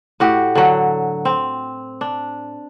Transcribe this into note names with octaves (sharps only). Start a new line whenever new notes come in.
A2 F#4 G4
D3 F#3
C4
D4